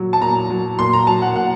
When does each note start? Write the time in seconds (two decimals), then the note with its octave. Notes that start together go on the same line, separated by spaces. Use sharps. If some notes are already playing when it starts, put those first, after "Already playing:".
Already playing: A#2 F#3
0.13 A5
0.21 A#2 A#5
0.50 F#3
0.79 A#2 C6
0.93 A#5
1.07 F#3 A5
1.22 F#5
1.36 A#2 F#5